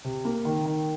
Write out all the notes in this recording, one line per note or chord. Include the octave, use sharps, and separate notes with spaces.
C3
A#3
D#3
D#3